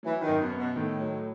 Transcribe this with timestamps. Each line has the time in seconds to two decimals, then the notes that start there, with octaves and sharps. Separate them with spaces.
0.03 E3 F#3
0.21 D#3
0.28 F#2
0.40 B2
0.51 B3
0.58 B2
0.76 A2 D#3
1.00 F#3